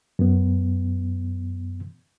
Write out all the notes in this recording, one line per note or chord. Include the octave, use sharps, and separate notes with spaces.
F#2 B3